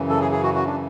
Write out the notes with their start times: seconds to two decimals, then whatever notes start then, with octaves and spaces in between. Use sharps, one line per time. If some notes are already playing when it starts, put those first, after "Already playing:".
Already playing: F#2 C#3 E3
0.09 A4
0.21 G#4
0.32 G#4
0.43 F#4
0.54 F#4
0.66 D4